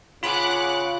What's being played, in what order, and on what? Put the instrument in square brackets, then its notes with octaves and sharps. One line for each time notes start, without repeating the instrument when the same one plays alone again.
[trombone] C#3 [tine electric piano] F4 B5 [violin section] F#5 D6 F#6